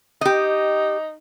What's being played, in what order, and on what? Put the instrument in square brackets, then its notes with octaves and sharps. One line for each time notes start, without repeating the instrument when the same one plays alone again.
[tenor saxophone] D#4 [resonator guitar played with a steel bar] G4 D#5